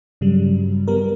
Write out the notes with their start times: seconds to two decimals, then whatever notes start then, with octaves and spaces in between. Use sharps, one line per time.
0.21 G2 C#3 F#3 G3
0.88 G3 B3 A#4